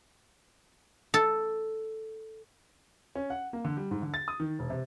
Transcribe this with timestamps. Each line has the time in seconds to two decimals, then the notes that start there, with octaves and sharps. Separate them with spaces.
1.14 A4
3.15 C#4
3.30 F#5
3.53 A#3
3.65 D3
3.77 G3
3.91 G#2
4.02 D3
4.14 A6
4.28 D#6
4.40 D#3
4.59 E1
4.70 C3